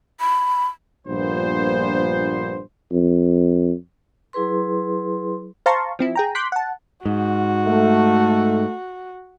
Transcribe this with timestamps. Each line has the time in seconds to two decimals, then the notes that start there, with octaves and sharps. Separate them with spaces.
0.20 B5
1.07 A#1 G2 A#2 B3 C5
2.92 F2
4.33 F#3 E4 G#4 B4 C6
5.66 C5 F5 A5 A#5 C6 C#6
5.99 F3 C4 E4
6.16 G#4 G5 A#5
6.35 C6 D6 F#6 G6 B6
6.52 F#5 A5
7.05 G#2 F#4
7.66 A3